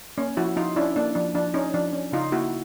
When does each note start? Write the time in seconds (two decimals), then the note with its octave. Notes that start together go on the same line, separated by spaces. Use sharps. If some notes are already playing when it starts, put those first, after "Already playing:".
0.18 A#3 C#4
0.37 F3 E4 F#4
0.56 F3 D#4 F4
0.76 C#4 D4 E4
0.96 A#3 D4
1.15 F3 D4
1.35 F3 D4
1.54 C#4 D#4
1.74 F3 D4
1.93 C#4
2.12 C#3 D#4 F4
2.32 A#3 E4 F#4